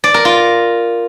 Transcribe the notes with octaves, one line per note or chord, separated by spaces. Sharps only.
D5
A#4
F4